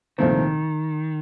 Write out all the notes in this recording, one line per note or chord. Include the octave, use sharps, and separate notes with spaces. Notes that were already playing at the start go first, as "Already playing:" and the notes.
C2 A#2 D#3 F3 A3 C4